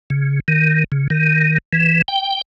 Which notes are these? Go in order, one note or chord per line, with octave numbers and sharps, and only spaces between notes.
C#3
D#3
C#3
D#3
E3
G5